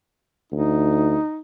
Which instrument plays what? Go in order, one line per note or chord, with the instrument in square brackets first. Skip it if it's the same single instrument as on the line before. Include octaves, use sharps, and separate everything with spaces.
[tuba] D2 [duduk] D#4